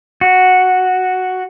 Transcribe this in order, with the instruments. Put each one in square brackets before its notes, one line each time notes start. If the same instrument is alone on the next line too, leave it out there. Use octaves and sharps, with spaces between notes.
[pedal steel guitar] F#4